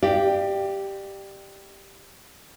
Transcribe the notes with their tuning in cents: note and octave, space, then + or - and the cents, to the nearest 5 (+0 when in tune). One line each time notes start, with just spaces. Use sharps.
G4 +0 D5 +30 F5 -30